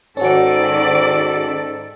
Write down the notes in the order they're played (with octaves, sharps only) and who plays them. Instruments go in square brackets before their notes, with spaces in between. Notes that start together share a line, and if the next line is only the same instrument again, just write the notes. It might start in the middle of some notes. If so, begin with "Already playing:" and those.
[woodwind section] G#2 A4 [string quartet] D#3 D5 [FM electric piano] C#4 F#4